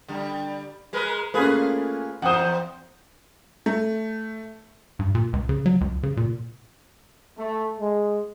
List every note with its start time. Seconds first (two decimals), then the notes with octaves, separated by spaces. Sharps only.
0.08 D3 G3
0.93 G#3 A#4 B4
1.34 A3 A#3 C#4 F4 G#4 B4
2.22 E2 C5 F#5 D#6
3.66 A3
4.99 G2
5.15 A#2
5.33 C#2
5.49 C#3
5.66 F#3
5.81 C#2
6.03 C#3
6.17 A#2
7.37 A3
7.78 G#3